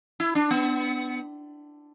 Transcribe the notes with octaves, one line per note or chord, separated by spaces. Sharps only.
E4
D4
B3